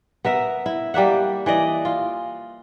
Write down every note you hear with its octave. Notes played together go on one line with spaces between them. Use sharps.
B3 A#4 E5
E4
G3 A#3 E5 F#5
E3 D5 D#5
F4